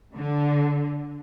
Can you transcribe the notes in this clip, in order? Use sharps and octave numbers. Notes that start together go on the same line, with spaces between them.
D3